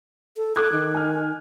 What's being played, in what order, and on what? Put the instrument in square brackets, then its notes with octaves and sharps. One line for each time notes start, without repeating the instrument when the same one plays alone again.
[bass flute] A4
[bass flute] A4 [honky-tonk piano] D6 F#6 G#6
[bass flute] D#3
[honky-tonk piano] G#5 F6